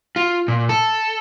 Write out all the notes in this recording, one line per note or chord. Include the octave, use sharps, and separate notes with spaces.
F4
A#2
A4